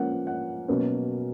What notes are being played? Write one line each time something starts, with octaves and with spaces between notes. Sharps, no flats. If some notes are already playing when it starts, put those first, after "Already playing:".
Already playing: F3 A#3 C#4 F#5
F#5
B2 F#3 A#3 C#4